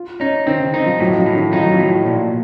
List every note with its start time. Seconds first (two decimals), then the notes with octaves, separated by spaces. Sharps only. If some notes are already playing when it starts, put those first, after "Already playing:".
Already playing: F4
0.20 C#4 D#4
0.47 D#3 C4
0.60 C#3
0.74 D#3 D#4
0.86 F3
0.99 A2 F#3
1.18 F3
1.26 A2
1.35 D#3
1.53 F3 D#4
1.64 F#3
1.74 F3
1.79 A2
2.06 A#2